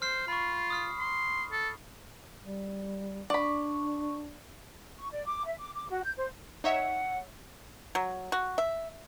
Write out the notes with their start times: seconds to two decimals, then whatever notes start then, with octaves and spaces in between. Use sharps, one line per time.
0.02 C5 F6 C7
0.28 F4 B5 C#6
0.70 D#6 F6 C7
0.99 C6
1.52 A4
2.40 G3
3.30 D4 D5 B5 C#6
4.99 C#6
5.12 D5
5.26 D6
5.46 E5
5.59 D6
5.75 D6
5.90 F#4
6.05 G6
6.17 C5
6.64 D#4 C#5 E5 F#5
7.95 F#3
8.32 F#4
8.58 E5